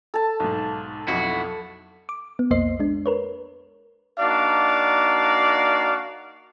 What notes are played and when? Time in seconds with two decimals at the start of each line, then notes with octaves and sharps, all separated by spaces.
0.14 A4 A5
0.40 B1 G#2
1.08 B1 F2 E4 F#4
2.09 D6
2.39 B3
2.51 B1 F2 A#3 C5 D#5 C7
2.80 G#3 D4
3.06 A#4 B4 C#5
4.19 A#3 D4 D#4 F#4 D5 F5